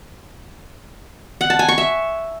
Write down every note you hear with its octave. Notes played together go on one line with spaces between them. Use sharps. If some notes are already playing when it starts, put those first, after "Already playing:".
F#5
A5
G#5
C#6
E5